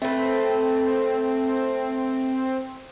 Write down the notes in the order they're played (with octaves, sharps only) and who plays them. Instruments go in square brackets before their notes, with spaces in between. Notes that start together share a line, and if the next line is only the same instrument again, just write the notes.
[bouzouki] A3 B4 [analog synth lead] C4